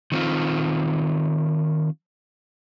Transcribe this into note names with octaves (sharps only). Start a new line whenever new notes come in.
D#3 C4 F4